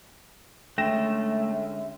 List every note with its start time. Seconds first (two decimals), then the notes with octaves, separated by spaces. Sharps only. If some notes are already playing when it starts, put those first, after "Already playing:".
0.78 D3 G#3 A3 C#4 E5 G5 A#6 E7